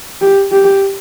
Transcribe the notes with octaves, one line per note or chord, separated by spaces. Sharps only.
G4
G4